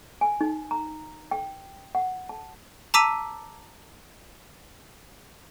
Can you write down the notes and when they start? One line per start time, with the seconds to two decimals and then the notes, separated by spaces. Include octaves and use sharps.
0.21 G#5
0.41 D#4
0.71 A#5
1.31 G5
1.95 F#5
2.29 A5
2.94 A5 A#5 D6 E6 B6 D#7